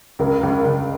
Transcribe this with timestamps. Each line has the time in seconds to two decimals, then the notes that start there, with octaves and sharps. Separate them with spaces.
0.19 C#2 A#4
0.43 C#2
0.65 C#2